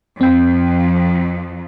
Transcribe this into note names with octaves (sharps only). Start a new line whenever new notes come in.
F2 C4 G5